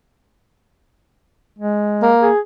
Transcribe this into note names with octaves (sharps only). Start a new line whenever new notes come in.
G#3
A#3
G#4